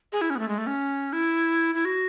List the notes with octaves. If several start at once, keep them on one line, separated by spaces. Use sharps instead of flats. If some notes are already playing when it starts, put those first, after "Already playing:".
G#4
E4
C#4
B3
A3
G#3
A3
C#4
E4
E4
F#4